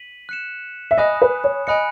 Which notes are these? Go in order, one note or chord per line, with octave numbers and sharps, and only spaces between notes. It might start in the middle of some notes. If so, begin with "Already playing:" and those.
Already playing: B6 D#7 F#7
F#6 C#7 E7
E5
D#5 G#5 B5 D#6 F#6
B4
C#5
D#5 G#5 B5 F#6 C#7